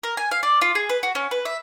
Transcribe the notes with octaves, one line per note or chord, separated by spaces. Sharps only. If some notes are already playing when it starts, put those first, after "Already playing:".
A#4
G#5
F5
D5
F4
G#4
B4
F#4
C#4
B4
E5